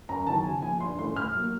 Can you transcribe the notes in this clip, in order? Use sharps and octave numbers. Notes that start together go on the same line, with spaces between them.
F#2 A#5
D#3 F#3 B3 E4 A5
C#3 G#5
F3 A#3 G#5
G2 C6
E3 A3 C#4 C6
A2 F6
F#3 A#3